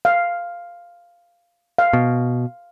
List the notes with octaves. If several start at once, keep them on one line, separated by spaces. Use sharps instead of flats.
F5
F5
B2